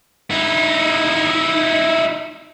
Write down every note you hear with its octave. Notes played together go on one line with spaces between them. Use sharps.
D#4 E4